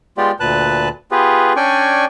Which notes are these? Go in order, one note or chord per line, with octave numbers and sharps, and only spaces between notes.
G#3 B3 F4 G4 D5
D2 A#2 B4 A5 F#6
B3 F4 G4 G#4 B4
C#4 D4 D5 G5 G#5 C#6